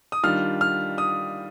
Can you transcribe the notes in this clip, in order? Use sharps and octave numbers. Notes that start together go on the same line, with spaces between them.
D#6
D#3 G3 D4 F4 F6
F6
D#6